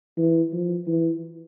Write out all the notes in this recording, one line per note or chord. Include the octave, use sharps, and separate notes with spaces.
E3
F3
E3